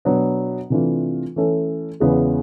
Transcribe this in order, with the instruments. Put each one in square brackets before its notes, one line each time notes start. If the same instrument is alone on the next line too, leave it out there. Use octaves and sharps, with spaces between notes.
[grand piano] B2 F#3 B3 D4
C3 E3 A3 D4 F4
E3 A3 C#4 E4 A4
E2 C#3 E3 G#3 B3